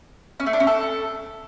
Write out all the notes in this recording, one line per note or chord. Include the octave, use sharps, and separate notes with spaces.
C#4
A3
D4
C#4
A4